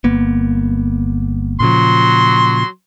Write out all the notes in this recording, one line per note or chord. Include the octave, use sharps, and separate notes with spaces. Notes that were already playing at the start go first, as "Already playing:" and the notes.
G1 A#3 B3
A#2 C#3 F3 F#3 C6